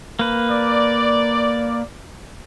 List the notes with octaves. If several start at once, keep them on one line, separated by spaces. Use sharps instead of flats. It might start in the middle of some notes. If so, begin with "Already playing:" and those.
A#3 B4
D5